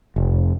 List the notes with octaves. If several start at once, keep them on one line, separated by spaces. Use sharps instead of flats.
F1